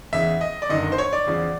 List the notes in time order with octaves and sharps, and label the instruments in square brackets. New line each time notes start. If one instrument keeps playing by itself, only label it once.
[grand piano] E2 C#3 E3 E5
D#5
D5
G1 F#2 D#3 D#5
C5
C#5
D5
E2 C#3 F3